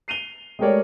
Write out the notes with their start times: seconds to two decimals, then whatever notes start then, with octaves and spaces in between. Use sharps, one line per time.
0.08 C7 D#7 F7 G7
0.59 G#3 A3 G4 A#4 C#5 D5